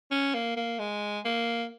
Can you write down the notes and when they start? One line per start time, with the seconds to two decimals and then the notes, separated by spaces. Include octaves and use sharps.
0.11 C#4
0.34 A#3
0.56 A#3
0.79 G#3
1.25 A#3